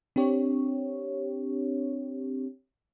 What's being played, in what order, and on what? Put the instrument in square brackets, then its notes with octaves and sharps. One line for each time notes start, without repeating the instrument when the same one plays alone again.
[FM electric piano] C4 D4 G4 C#5